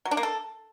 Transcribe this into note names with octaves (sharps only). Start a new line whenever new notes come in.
F#3
D4
A#3
A4